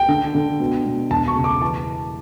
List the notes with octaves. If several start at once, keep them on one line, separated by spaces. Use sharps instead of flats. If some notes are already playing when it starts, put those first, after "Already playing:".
Already playing: G5
D3
D3
B2
B2
E1 A5
C#6
C#3
D6
E3 A5